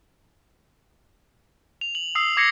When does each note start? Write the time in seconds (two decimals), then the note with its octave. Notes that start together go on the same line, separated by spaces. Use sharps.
1.81 F7
1.95 F#7
2.15 D#6 E6 C7
2.37 D6 G#6 A#6 C7 C#7